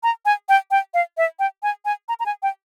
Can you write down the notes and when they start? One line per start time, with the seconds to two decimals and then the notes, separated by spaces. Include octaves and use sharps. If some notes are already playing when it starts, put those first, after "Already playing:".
0.03 A#5
0.25 G#5
0.49 G5
0.71 G5
0.94 F5
1.17 E5
1.39 G5
1.63 G#5
1.85 G#5
2.09 A#5
2.20 A#5
2.26 G#5
2.43 G5